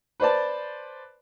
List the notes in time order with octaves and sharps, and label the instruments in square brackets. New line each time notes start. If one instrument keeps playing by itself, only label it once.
[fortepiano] B4 C5 D5 A5